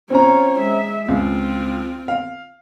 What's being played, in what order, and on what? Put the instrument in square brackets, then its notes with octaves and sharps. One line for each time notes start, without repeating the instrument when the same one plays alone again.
[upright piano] C4 C#4 A#5 [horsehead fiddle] F4 C#5
[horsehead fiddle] G#3 E5
[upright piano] C#2 [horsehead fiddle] C4 F4
[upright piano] F5